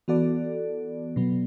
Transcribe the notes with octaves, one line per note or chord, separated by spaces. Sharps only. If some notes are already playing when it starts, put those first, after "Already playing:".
E3 B3 F#4 A4 D5
B2 F#3 B3